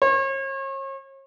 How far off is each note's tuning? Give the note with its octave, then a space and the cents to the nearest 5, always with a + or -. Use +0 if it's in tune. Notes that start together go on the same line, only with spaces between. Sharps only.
C#5 -40